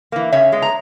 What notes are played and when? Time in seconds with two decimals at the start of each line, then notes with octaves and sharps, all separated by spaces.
0.12 E3 A#3
0.32 C#3 C#5 E5
0.52 G#3 B3
0.62 A#5